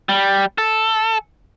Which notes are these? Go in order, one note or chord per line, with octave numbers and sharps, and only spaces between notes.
G3
A4